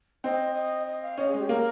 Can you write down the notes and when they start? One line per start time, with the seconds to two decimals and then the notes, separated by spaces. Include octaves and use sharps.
0.24 C4 D#5
0.55 D#5
0.87 D#5
1.03 F5
1.18 C#4 D#5
1.28 G#4
1.34 G#3
1.39 G4
1.49 A#3 A#4